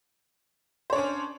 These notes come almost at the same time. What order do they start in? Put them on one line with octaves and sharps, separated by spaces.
C5 C#5 D4 C#4